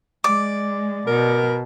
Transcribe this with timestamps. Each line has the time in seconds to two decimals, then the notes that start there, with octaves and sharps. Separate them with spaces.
0.24 G#3 D5 D6
1.07 B2 A#4